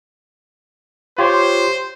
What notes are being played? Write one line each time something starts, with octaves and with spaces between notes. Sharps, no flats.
F4 G4 C5 C#5